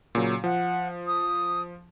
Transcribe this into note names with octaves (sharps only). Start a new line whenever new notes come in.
A#2 C#3 F#3
F3 F#5
D#6